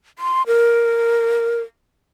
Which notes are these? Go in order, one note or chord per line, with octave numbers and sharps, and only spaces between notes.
C6
A#4